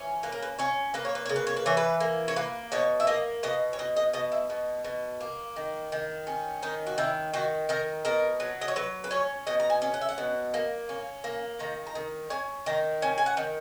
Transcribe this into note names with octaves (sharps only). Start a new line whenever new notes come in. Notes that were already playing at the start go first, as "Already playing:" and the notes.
Already playing: E3 C#4
A#3 B4
A#4
B4
C#4 C#5
A#3 B4
C#5
B4
C#3 C#5
B4
C#5
B4
E3 C#5
B4
A#3
C#5
A#3 B4
B2 C#5
E5
A#3 D#5
B2 D#5
C#5
B2 D#5
D#5
B2 D#5
E4
B2
B2
A#3
D#3
D#3
C#4
D#3 D#4
F#4
D#3 E4
D#3 F#4
D#3 A#4
B2 A#4
F#3
D#5
C#5
F#3 B4
B4
C#4 C#5
B2 D#5
A#5
G#5
C#4
F#5
E5
F#5
B2
A#3
C#4
A#3
D#3 A#5
A#5
D#3
C#4 G#5
D#3 A#5
C#4 G#5
G#5
F#5
D#3